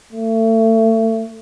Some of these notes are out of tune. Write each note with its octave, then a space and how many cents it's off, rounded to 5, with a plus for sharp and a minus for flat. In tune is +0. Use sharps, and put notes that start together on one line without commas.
A3 +30